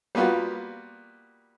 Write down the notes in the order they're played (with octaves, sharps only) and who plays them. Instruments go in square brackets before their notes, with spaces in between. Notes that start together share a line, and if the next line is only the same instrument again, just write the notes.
[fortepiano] G3 A#3 B3 F4 F#4